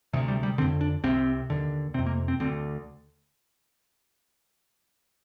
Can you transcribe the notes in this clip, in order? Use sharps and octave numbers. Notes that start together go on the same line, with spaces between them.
D2 C3
G3
G3
F2 D3 C4
D4
C2 C3 C4
D#2 D3
F2 C3 C4
A#3
C4
D2 D3 C4